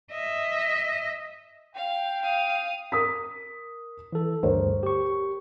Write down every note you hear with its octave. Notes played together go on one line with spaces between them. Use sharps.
D#5 E5
F5 G5
F5 D#6
A#4 D#6 B6
E3 A4
D2 G2 A#4 C5 C#5
G4 C#6